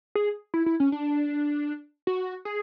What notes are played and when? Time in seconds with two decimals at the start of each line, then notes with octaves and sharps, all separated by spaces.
0.15 G#4
0.54 E4
0.66 E4
0.80 C#4
0.92 D4
2.07 F#4
2.45 G#4